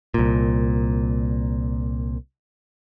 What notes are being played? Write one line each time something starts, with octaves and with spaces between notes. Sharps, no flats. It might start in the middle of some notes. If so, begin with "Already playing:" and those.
C2 A#2